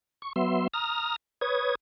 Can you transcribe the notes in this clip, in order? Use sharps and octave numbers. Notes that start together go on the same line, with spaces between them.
C#6
F#3 B3 E5 C6
A#5 D#6 F6 A#6
B4 C#5 D#6 G#6